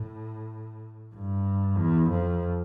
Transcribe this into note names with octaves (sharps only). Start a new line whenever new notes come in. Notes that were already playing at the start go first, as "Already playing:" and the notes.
Already playing: A2
G2
E2
F2